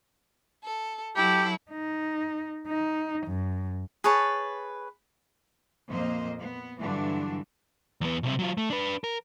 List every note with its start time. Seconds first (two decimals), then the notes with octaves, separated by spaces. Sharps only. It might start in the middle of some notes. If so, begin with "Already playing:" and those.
0.65 A4
1.16 F#3 E4 G4 A4
1.71 D#4
2.68 D#4
3.27 F#2
4.04 G#4 B4 C#5 A5
5.88 F2 A#2 A#3 C5 D#5
6.39 B3
6.80 G2 D3 E3 F#3 D4
8.01 E2 B3
8.23 B1 C3
8.39 F#3 F4
8.58 A3
8.70 D4 B4
9.04 A#4